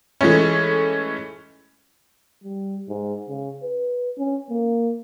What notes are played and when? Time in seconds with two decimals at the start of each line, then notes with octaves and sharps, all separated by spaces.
0.21 E3 G#3 A3 C#4
2.44 G3
2.88 G#2
3.29 C#3
3.63 B4
4.18 C#4
4.50 A#3